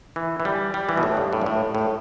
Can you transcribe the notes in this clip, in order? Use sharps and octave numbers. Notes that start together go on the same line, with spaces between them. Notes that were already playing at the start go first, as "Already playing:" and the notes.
E3
E3
G3
G3
E3
B2
A2
G2
A2
G2
A2
A2